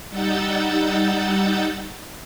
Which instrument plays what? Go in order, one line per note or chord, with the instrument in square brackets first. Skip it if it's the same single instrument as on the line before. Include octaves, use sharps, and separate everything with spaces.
[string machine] G3 D#4 F#5 E6 G6 A6